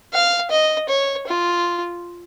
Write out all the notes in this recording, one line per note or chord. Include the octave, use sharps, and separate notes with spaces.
F5
D#5
C#5
F4